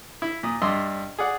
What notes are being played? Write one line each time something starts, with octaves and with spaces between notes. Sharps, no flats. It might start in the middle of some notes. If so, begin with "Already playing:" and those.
E4
A#2 D#6
G2 D4 D#5 E5 C6
G#4 D5 F#5